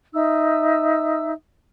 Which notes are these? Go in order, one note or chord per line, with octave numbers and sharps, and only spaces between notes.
D#4 E5 E6